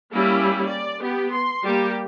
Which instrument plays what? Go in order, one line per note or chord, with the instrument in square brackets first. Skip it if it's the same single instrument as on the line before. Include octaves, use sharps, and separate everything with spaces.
[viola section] G3 A#3 C#4 E4
D5
B3 G4
C6
G3 A#3 G4